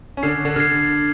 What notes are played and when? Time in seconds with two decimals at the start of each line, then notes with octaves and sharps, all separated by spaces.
0.17 C#4
0.23 D3 D4 F6 G#6 C7
0.45 D3 D4
0.56 D3 D4 F6 G#6 C7